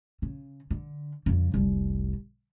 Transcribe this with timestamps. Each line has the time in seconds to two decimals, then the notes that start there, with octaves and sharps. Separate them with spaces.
0.22 C#3
0.70 D3
1.26 F2 C#3
1.54 F1 C2